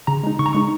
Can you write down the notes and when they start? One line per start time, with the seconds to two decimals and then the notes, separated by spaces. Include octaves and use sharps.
0.07 C#3 A#5
0.23 G#3 D#4
0.39 C#3 C#6
0.46 A#5
0.53 G#3 D#4 C#6